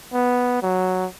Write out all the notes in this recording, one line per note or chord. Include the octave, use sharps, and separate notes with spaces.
B3
F#3